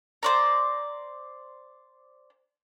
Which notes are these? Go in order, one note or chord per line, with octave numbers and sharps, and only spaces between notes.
C5 D5 A#5